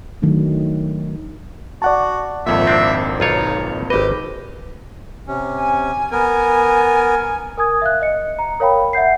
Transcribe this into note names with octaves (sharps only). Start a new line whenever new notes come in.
D#3 F#3 A3 D4
F#4 D5 F#5 A5
G#1 F2 A#2 E5
C4 D4
B1 D#4 F4 C#5
G#1 G4 B4 D#5
C3 C#4
G#5
B3 A#4 G#5
A#4 G#5 D#6 G#6
E5 F5 F#6
D#5 C#7
A#5
A#4 C#5 F5 G5 B5
E5 F#5 G6 C7